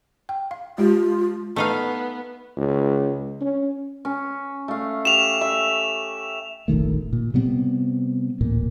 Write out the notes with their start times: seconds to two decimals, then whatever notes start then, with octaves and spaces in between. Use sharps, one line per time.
0.29 G5
0.51 F5
0.78 G#3 F4 G4
1.56 A3 B3 D#4 F5
2.57 C#2
3.42 C#4
4.05 C#4
4.68 A3 F5
5.05 G4 E7 F7
5.41 E5
6.68 F1 A#1 D#3 A3
7.13 A#2
7.34 C3 G3 B3 C4
8.41 D1 A1 A#2